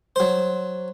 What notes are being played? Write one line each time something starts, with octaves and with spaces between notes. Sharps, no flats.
F#3 C5